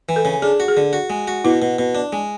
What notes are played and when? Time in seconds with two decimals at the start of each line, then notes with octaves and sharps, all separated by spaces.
0.09 E3
0.16 A4
0.25 C#3
0.42 D4 G#4
0.60 F#4
0.68 G#4
0.77 D3
0.93 F#4
1.10 G#3
1.28 F#4
1.44 B2 E4
1.62 B2
1.79 B2
1.95 D4
2.13 G#3